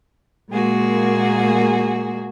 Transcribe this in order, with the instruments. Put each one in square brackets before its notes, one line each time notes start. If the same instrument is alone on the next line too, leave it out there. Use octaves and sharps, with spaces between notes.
[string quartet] A#2 G#3 A#3 F#4 G#4